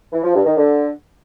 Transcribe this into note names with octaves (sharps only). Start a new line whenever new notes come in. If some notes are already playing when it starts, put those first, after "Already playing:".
E3
F3
G2
D#3
D3